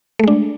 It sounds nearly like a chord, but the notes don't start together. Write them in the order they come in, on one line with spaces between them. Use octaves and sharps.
A3 G#3 D4